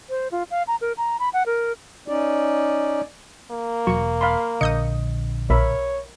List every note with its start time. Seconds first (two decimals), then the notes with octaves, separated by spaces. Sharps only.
0.10 C5
0.32 F4
0.51 F5
0.67 A#5
0.81 A#4
0.97 A#5
1.19 B5
1.33 F#5
1.46 A#4
2.08 C#4 D#4 D5
3.51 A#3
3.87 E1 F#3 C#6
4.21 F5 B5 C6
4.61 A#1 D3 D#5 D#6 G6 C#7
5.50 B1 A#4 C#5 E5 B5